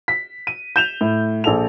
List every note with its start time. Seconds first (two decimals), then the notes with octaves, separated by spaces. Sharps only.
0.08 B6
0.47 D#7
0.76 G6 E7 F7
1.01 A2
1.44 A#1 A4 F7